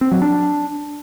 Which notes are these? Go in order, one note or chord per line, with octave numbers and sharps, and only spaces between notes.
C4
F#3
D4